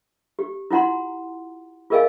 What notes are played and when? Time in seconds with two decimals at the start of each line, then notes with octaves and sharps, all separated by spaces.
0.39 G4
0.71 E4 F4 F#5 A#5 C6
1.90 F4 G#4 A#4 D#5 F5 G#5